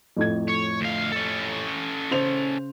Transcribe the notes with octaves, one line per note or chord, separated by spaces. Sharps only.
F2 A2 G#6
C#5
D2 F5
C#4 A4
C#3 C5 F7